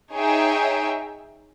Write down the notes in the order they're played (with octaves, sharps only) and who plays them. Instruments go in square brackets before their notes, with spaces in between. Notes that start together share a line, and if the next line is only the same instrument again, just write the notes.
[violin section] D#4 G#4 C#5 E5 G5